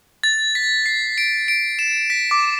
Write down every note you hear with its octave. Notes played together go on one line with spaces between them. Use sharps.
A6
B6
C7
D7
D7
E7
B6
D6